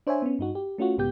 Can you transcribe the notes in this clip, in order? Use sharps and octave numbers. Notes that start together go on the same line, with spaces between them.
D4 C5 C#5 E5 G#5
B3 C#4
G2 D#4 F#4
G4
A3 C#4 F4 F#4
B1 G#2 C#3 B3 G4 G6